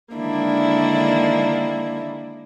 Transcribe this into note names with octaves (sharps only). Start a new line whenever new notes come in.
D3 D#3 G#3 A#3 D4 E4